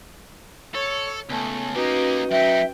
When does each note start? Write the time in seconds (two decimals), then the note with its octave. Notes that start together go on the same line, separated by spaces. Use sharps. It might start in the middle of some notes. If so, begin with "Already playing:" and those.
0.74 A4 C#5
1.29 C#2 A3 B3 G#5 A5
1.75 A#3 C#4 D#4 F#4 G4 B4
2.31 F#2 D#4 E5 G5